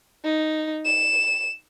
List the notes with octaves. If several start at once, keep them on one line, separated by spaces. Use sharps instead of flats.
D#4
E7